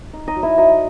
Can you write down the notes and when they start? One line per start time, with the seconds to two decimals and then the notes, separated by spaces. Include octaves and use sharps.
0.13 D#4
0.27 D#4 D#5
0.36 F#3
0.43 E4 E5
0.57 F#3 D#4 D#5